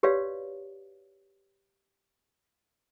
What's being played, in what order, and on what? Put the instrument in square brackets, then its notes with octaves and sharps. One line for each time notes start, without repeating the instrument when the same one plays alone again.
[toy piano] F#4 G4 B4 C#5 D5 F5